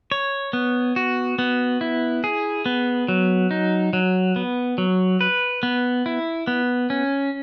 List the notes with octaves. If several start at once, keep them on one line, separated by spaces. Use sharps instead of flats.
C#5
B3
F#4
B3
E4
G#4
B3
F#3
D#4
F#3
B3
F#3
B4
B3
E4
B3
C#4